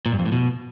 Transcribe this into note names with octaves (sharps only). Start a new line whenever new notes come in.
A#2
G2
F2
A2
B2